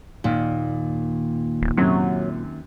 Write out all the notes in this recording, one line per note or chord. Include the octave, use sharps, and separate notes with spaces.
D#2 A#2 D#3
D1
F#2 C3 F#3